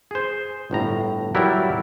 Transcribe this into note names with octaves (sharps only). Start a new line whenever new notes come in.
G#4 C5
G1 A2 A#5
F#3 G3 E4 G4 A#4